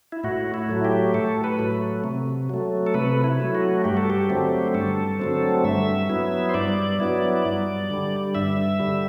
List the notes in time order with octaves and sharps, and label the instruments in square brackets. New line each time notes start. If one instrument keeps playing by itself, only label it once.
[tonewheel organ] E4
A2 F#4
E4
F#3 A3
G4
A2 A4
B4
F#3 A3
C3
F#3 A3
A4
C3 B4
E4
F#3 A3
F#4
G2 G4
A4
G4
D3 F#3 A3 C4
G2 A4
D3 F#3 A3 C4
G2 E5
F#3 B3 E4
C5
G2 D5
F#3 B3 E4
G2
D3 G3
G2 E5
D3 G3